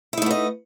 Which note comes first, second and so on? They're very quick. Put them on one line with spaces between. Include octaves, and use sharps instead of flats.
E4 D#4 A3 B3 D#5